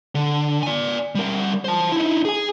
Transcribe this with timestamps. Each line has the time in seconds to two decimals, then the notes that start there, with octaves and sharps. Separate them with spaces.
0.15 D3
0.63 D5 G#5
1.15 G3 A#4
1.65 C5 A5
1.92 D#4 E4
2.25 G#4 G#5